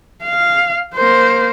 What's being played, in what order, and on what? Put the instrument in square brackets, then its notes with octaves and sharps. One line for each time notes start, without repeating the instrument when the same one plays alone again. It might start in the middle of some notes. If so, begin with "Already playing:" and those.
[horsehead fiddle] F5
A#3 C5